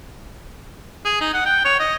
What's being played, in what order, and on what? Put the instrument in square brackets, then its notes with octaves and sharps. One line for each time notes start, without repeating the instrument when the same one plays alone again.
[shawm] G#4
D#4
F#5
G5
C#5
D#5